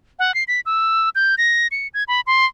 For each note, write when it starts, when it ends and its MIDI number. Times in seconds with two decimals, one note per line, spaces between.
0.19 0.34 78
0.34 0.44 96
0.48 0.60 95
0.66 1.09 88
1.15 1.35 91
1.38 1.67 94
1.71 1.88 97
1.94 2.04 92
2.08 2.21 83
2.27 2.46 84